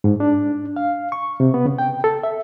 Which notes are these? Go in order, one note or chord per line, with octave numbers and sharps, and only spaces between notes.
G#2
D4
F5
C#6
C3
B3
C#3
G5
A4
E5